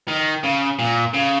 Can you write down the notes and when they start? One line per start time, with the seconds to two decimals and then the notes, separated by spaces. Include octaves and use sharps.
0.08 D#3
0.43 C#3
0.79 A#2
1.14 C#3